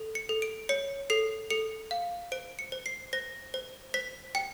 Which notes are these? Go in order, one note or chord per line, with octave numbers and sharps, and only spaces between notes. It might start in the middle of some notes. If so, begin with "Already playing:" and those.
Already playing: A4
C#7
A4
D7
C#5 C#7
A4 C7
A4 C#7
F5
C5 D7
C#7
C5
C7
C5 A#6
C5
C5 B6
G5 C#7